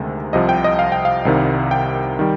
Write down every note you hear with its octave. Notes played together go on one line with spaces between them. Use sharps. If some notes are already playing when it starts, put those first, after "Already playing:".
Already playing: D2 C3 D#3 G#3
C2 C3 F3 D#5
G5
D#5
F5
G5
F5
C2 C3 D#3 G3
G5
D#3 G3